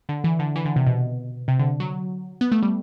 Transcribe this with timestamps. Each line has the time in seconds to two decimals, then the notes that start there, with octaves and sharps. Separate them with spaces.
0.09 D3
0.24 E3
0.39 D3
0.56 E3
0.65 D3
0.76 C3
0.87 B2
1.48 C3
1.59 D3
1.80 F#3
2.41 B3
2.52 A3
2.63 G3